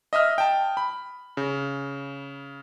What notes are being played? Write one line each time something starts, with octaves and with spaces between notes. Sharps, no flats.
D#5 E5 D#6 F6
G5 A5
B5
C#3